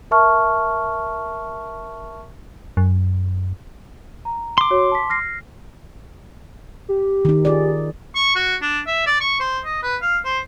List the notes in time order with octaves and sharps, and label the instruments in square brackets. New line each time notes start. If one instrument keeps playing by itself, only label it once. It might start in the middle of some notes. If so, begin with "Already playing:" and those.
[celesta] A#4 E5 A5 C#6 F6
[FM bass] F#2
[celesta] A#5
[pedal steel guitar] C6 D6
[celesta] F#4 C#5
A5 B6
F6 A#6 C7
[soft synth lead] G4
[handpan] D#3 D#4
F4 G#4 D5
[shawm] C#6
F#4
D4
E5
D5
C#6
C5
D#5
B4
F5
C5